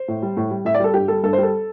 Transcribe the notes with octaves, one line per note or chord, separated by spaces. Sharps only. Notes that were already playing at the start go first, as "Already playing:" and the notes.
Already playing: C5
A2
G3
A2
G3
A2 E5
D5
G3 A4
G2 G4
G3 A4
G2 A4
C5
G3 A4